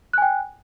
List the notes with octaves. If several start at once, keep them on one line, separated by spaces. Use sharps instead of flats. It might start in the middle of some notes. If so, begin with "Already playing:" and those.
G5 G#5 F#6